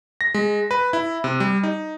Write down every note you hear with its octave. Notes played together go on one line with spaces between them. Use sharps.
A#6
G#3
B4
E4
C3
G3
D#4